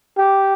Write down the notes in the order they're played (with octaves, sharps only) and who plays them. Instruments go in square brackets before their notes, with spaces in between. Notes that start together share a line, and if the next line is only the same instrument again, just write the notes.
[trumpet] G4